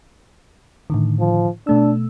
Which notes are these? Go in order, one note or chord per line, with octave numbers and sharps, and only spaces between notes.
A2 D3 D#3
F3
B2 A3 D4 E6